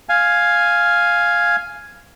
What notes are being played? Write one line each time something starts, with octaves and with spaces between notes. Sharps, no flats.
F5 G#5